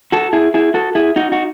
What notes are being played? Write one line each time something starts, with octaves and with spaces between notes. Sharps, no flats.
F#4 A4
E4 G#4
E4 G#4
F#4 A4
E4 G#4
D#4 F#4
D#4 F#4